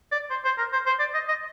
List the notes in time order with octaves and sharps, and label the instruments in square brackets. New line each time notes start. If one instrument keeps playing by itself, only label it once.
[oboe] D5
C5
C5
A#4
C5
C5
D5
D#5
D#5